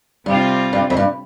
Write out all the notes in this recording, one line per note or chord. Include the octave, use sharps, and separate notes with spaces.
G2 C3 G3 C4 F4
G2
F2
G2